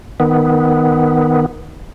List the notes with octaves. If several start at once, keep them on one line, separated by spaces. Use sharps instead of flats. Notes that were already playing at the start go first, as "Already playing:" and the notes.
D#3 B3